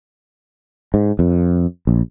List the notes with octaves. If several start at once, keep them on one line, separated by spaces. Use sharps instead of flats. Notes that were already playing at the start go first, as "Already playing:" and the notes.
G#2
F2
A#1